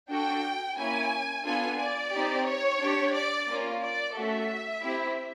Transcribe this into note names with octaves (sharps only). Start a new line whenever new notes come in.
D4 F#4 A4 G5
A#3 C#4 E4 G#5
B3 D4 F4 A4 G#5
D5
C4 D#4 G4
C#5
D4 G4
D5
A#3 C#4 F4
D5
A3 C#4 F#4 A4 E5
C4 E4 G4